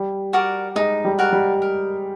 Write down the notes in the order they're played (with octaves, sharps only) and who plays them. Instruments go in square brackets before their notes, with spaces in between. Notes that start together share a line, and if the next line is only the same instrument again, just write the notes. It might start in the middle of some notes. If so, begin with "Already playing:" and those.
Already playing: [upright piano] G3
[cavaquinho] F#4 A#4 D5
[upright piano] G#3 [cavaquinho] D#4
[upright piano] G3
[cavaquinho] F#4 A#4 D5
[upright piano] G3
[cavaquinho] A#4